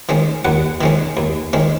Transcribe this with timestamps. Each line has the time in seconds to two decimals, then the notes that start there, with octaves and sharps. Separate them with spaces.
0.09 D#3 G#3 C#4
0.45 D#2 F#5
0.81 D#3 G#3 C#4
1.17 D#2
1.53 D#3 G#3 C#4